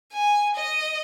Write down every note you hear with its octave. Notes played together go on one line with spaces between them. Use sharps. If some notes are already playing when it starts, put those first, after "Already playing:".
G#5
D#5